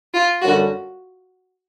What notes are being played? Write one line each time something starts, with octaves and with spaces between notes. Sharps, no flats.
F4
F#2 D3 G3 F#4